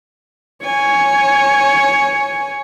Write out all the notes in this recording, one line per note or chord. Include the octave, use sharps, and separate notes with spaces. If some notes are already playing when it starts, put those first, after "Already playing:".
C#5 G#5